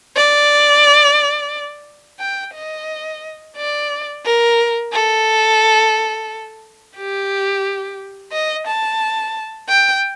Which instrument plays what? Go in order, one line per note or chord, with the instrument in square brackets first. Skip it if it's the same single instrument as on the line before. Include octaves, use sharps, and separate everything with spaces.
[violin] D5
G5
D#5
D5
A#4
A4
G4
D#5
A5
G5